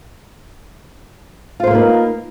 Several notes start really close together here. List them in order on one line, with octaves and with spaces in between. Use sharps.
F4 C5 A#3 B4 D#4